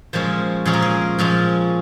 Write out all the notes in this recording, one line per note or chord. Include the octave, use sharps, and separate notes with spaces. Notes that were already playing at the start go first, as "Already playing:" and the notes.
A#2 F3 G#3 C#4 C5
A#2 F3 G#3 C#4 G#4
A#4
G#4
A#2 F3 G#3 C#4